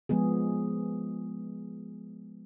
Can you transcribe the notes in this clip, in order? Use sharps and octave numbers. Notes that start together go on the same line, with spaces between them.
F3 G#3 B3 G#4